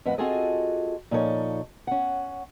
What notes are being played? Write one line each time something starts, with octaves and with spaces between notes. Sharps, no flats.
F2 A2 B4 F#5
C4 F4 F#4 G#4 A4 D#5
A#2 F3 D#4 A4 C#5
C#4 F#5